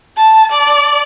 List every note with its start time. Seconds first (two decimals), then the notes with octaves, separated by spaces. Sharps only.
0.17 A5
0.51 D5